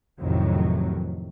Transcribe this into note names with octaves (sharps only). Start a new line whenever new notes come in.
A1 F2 A2 C3 D#3 F#3